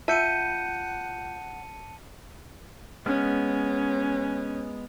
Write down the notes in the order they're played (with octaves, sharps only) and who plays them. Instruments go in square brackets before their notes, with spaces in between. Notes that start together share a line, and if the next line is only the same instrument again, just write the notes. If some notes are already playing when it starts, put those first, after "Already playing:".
[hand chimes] F4 G6 [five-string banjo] E5 [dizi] F#5 [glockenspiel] A5 C#7 D#7
[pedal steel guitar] G#3 B3 F6 [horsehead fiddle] C#4